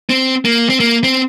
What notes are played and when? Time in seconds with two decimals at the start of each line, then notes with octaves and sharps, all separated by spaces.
0.09 C4
0.45 A#3
0.69 C4
0.80 A#3
1.04 C4